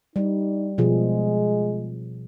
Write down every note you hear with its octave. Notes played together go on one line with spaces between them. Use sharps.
G3 D#4
B2 F3 G#3 G#4